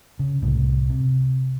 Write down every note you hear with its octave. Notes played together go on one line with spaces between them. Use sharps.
C#3
C2 A2
C3